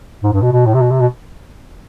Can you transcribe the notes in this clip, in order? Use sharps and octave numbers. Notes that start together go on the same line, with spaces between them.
G#2
G2
B2
B2
A2
C3
B2
C3
B2